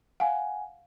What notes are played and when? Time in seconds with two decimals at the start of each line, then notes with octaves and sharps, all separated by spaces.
0.20 F5 F#5 G#5